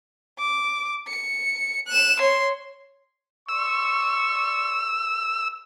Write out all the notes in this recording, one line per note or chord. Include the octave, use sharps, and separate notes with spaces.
D6
C#7
F#6 E7
C#5 C6
D5 C6 C#6 E6